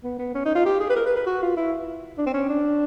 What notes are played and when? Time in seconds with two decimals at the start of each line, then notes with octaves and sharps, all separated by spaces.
0.04 B3
0.19 B3
0.35 C#4
0.45 D#4
0.55 F4
0.65 G4
0.80 G#4
0.90 B4
0.96 A#4
1.06 B4
1.16 B4
1.26 F#4
1.42 F4
1.57 E4
2.18 D4
2.26 C4
2.34 C#4
2.49 D4